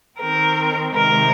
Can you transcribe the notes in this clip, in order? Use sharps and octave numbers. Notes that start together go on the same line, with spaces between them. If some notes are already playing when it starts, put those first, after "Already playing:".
D#3 C4 A#4
C3 D#3 G#3 A#4